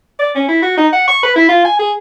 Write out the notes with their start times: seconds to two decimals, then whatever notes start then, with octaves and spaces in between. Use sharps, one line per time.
0.19 D5
0.35 C#4
0.49 E4
0.63 F#4
0.78 D#4
0.93 F#5
1.08 C#6
1.23 B4
1.36 E4
1.49 F4
1.65 G#5
1.79 G#4